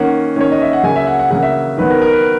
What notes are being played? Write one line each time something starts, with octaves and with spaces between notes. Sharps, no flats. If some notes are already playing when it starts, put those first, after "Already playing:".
Already playing: D#3 A#3 C#4 F#5
D#3 A#3 C#4 C#5
D#5
E5
F#5
C#3 F#3 A#3 G#5
E5
F#5
F#5
C#3 F#3 A#3 F#5
E5
D#3 F#3 B3 B4
A#4
A#4
B4